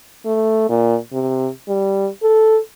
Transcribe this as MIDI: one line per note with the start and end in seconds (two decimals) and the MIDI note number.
0.25 0.67 57
0.69 0.97 46
1.12 1.48 48
1.68 2.08 55
2.23 2.59 69